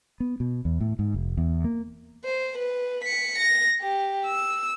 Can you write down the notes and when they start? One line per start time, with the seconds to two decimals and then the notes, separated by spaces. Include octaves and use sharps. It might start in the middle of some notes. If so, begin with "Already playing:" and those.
0.20 B3
0.40 B2
0.65 E2
0.81 A2
0.99 G#2
1.14 F1
1.37 E2
1.64 A#3
2.24 C5
2.58 B4
3.04 B6 C#7
3.39 A#6
3.81 G4
4.26 E6